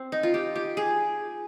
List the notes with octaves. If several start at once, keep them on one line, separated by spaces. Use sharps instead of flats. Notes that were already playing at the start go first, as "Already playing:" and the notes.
Already playing: C4
D#4
F4
G4
G4
G#4